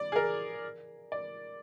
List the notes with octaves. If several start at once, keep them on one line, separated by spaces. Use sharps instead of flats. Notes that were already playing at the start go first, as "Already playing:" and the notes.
Already playing: D5
G#4
A#4
D5